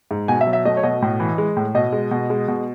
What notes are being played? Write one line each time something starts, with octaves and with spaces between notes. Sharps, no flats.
G#2
B2 G#5
E5
F#3
E5
A3 D#5
C#5
B2 D#5
A2
E3
G#3
A2
B2 D#5
G#3
B2
G#3
B2